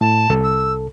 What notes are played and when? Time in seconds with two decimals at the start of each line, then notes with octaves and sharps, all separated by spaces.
0.01 A2 A5
0.30 C2 A4
0.44 E6